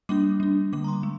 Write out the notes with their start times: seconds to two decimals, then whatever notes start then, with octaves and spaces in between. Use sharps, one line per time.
0.09 G3 A#3 D4 D6
0.40 G3 D4
0.73 D3 G3 A#3 D6
0.84 A#5
0.88 C6
1.03 G#3